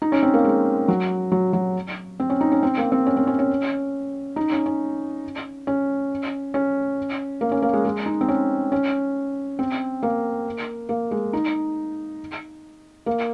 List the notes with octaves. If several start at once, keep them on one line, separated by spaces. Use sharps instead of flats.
D#4
C#4
C4
A#3
G#3
F#3
F#3
F#3
C4
C#4
D#4
C#4
C4
A#3
C4
C#4
C4
C#4
C#4
D#4
C#4
C#4
C#4
C#4
A#3
C#4
A#3
G#3
G#3
D#4
C4
C#4
C#4
C4
A#3
A#3
G#3
D#4
A#3